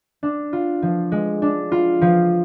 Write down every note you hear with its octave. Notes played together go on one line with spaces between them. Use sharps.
D4
F4
F3
G#3
D4
F4
F3